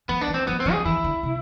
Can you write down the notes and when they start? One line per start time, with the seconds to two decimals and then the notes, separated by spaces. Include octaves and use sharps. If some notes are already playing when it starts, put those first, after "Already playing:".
0.09 F3 B3
0.21 D4
0.28 E3
0.34 C4
0.47 F3 B3
0.60 C4
0.66 F3
0.72 G#4
0.85 E3 E4
1.04 D3
1.23 C3